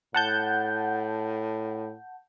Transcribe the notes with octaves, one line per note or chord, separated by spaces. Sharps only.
A2 F#5 A5 G6